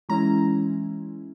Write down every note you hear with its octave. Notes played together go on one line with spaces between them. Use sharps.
E3 G#3 C#4 E4 A#5